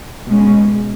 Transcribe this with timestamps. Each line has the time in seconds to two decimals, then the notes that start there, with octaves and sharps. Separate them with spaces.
0.27 B2 G#3 C#4